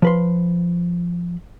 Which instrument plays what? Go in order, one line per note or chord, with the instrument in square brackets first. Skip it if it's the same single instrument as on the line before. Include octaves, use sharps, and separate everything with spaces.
[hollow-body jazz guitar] F3 B4 C6